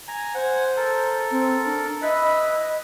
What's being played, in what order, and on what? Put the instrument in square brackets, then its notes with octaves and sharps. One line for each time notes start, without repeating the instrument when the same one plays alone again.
[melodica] G#5 A#5
[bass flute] C5 [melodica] F#5 G#5
[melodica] A4 A#4
[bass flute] C4
D4
[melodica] E4 B4 B5 [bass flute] D#5